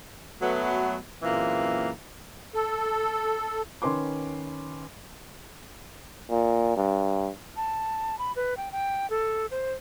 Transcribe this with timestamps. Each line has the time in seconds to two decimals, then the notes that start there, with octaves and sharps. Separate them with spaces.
0.42 F#3 A3 B3
1.23 F#2 A#2 E3 G#3 A#3 C4
2.54 A4
3.82 D#3 C#4 B4 C6 D6
6.30 A#2
6.77 G2
7.56 A5
8.19 B5
8.36 B4
8.57 G5
8.72 G5
9.10 A4
9.51 C5